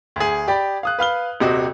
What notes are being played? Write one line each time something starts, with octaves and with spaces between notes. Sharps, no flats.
D2 G#4
G4 D5 B5
F5 D#6 F#6
B4 F5 F6 G7
D#1 C3 C4 F#4 D#5